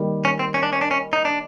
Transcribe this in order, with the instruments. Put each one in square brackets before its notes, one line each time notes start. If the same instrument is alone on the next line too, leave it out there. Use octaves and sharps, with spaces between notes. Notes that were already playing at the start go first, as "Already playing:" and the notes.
Already playing: [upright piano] D#3 G3 A#3
[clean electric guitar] C#4
C4
C#4
D4
C#4
D4
C#4
D#4
D4